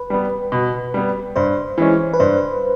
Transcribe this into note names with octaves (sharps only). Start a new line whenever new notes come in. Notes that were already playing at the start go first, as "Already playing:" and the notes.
Already playing: B4
G3 B3
B2
G3 B3
G2 C5
E3 G#3 C#4
B4
G2 C5